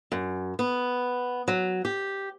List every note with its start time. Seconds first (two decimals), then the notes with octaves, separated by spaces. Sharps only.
0.12 F#2
0.59 B3
1.48 F#3
1.85 G4